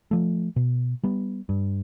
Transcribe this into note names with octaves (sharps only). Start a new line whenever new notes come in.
F3 A3
B2
G3 B3
G2